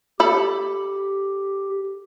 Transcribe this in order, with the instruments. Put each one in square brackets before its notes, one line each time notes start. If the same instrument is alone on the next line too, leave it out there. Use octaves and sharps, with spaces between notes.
[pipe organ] G4 [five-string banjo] A4 B5